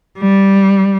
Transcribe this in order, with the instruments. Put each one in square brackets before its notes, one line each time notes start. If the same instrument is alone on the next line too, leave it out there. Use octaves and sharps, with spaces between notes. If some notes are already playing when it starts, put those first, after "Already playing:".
[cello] G3